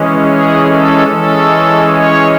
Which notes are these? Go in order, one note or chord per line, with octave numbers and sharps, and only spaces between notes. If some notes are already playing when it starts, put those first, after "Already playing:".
Already playing: E3 G#3 C#4
G#4
A4
E3 G#3 C#4 A4
C#5